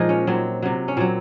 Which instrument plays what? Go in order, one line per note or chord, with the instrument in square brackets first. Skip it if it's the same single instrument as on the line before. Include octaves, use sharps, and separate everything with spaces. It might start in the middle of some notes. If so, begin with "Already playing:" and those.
Already playing: [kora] A#2 F3 G#3 D#4
C#4
A#2 F#3 C4
C3 F#3
C#4
A#2 F#3 C4